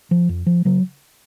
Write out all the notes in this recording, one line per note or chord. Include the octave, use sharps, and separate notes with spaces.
F3
F2
F3
C#3 F#3